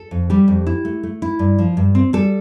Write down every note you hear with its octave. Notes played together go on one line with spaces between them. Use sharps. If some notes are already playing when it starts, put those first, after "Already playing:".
Already playing: A4
F2
G3 G4
F2
E4
A3
A3
E4
G2
F3
G2
C4
G3 A4